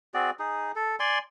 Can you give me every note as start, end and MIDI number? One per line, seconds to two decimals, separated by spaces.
0.14 0.30 60
0.14 0.30 66
0.14 0.30 68
0.14 0.30 74
0.39 0.72 63
0.39 0.72 68
0.76 0.96 69
1.00 1.18 74
1.00 1.18 80
1.00 1.18 84